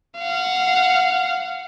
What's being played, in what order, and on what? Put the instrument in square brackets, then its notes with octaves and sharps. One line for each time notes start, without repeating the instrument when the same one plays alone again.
[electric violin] F5 F#5